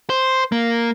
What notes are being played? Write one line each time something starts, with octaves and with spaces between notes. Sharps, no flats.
C5
A#3